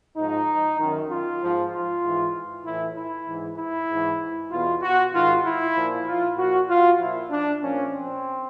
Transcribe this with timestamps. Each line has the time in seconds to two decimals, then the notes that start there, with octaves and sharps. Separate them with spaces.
0.16 G#2 F3 D#4
0.79 F#2 D#3
1.10 F4
1.41 G#2 F3
1.72 F4
2.03 G#2 E3
2.65 A2 E3 E4
2.96 E4
3.27 G#2 E3
3.58 E4
3.89 G#2 E3
4.51 E2 B2 F4
4.82 F#4
5.13 G#2 D#3 F4
5.44 E4
5.75 A#2 F3
6.07 F4
6.37 A#2 F3 F#4
6.68 F4
6.99 A#2 F3 E4
7.30 D4
7.61 A#2 F3 C#4
7.92 C4